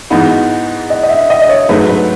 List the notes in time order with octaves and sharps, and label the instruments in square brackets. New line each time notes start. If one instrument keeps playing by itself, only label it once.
[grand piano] G#2 E3 B3 D#4 F#4
[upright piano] D#5
D#5
E5
D#5
D#5
C#5
[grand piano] G#2 F#3 A3 [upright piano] B4
[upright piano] B4